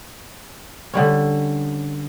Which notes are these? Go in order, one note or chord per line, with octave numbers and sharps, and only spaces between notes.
D3 G3 C#4